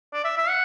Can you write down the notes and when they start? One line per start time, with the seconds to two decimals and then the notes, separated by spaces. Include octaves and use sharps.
0.13 D5
0.24 E5
0.38 E5
0.49 F#5